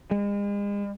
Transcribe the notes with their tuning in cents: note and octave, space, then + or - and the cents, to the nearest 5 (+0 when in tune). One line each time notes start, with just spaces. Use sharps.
G#3 -40